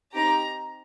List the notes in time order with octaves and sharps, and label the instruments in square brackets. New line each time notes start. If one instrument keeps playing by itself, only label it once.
[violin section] C4 D#4 G4 A#5